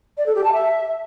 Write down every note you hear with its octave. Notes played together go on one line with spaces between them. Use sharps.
D5
A4
G4
A5
E5